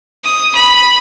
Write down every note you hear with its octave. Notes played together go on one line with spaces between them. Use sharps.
D#6
B5